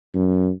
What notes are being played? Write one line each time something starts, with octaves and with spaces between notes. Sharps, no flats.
F#2